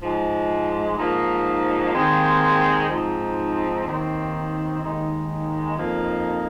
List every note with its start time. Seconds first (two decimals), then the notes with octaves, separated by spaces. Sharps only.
0.01 G#2 F3 G#3
0.97 G#2 F3 A#3 D#4
1.92 D#2 D#3 G#3 C4
2.89 G#2 F3 C4 D#4
3.85 D#2 D#3 C4 D#4
4.81 D#2 D#3 G#3 D#4
5.77 F2 F3 A#3 D#4